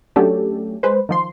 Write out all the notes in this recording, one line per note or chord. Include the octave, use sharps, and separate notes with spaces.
F#3 A3 C#4 D4 G4 A4
G#3 B4 C5
D#3 F3 C6